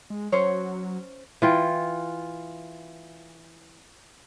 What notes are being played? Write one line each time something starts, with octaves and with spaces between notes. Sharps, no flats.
G#3
F#3 C#4 C5 C#5
E3 F4 G5